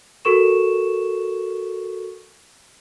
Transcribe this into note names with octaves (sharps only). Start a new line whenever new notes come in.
F#4 A4 A#4 C#6 E7